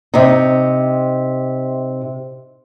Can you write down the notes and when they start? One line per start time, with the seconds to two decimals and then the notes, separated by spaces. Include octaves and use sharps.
0.14 C3 D#4